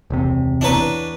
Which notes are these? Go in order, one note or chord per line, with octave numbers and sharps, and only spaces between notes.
E1 C#2 C3
E2 D4 B4 C#5 A#5